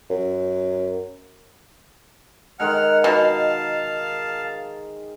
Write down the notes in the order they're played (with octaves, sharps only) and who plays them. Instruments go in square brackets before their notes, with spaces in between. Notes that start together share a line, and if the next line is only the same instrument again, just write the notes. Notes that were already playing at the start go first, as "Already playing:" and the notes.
[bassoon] F#2
[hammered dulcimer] D#3 G#3 [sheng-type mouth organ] F#5 F6
[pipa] B2 [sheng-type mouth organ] F5 A5